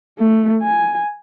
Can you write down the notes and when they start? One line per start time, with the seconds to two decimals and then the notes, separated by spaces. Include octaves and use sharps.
0.19 A3
0.62 G#5